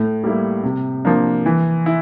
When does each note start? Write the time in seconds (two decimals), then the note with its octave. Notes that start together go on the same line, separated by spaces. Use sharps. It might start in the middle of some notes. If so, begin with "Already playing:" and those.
Already playing: A2
0.24 G3 A#3 E4
0.63 C3
1.05 F3 A#3 D4
1.46 E3
1.86 E4